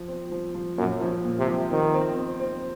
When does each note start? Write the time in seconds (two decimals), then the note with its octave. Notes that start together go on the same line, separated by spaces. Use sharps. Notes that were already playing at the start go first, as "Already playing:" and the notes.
Already playing: F3
0.08 C4
0.31 F3
0.55 F3
0.78 F#2 A#2
1.01 F3
1.24 A#2
1.39 C3
1.47 F3
1.71 D#3 C4
1.94 C4
2.17 C4
2.40 C4